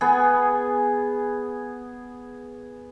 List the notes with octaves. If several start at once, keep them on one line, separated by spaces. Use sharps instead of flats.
B3 G#4